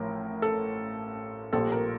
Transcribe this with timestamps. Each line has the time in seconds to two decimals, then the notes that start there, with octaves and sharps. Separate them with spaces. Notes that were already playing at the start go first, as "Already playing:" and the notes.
Already playing: A1 A2 F3 A#4
0.42 A4
1.53 A#1 A#2 G3 A4
1.72 A#4